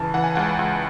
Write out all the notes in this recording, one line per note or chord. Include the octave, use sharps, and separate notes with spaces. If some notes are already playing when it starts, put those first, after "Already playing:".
Already playing: C#3 E3 A5
E3 F#5
G#5
C#2 F#5
C#2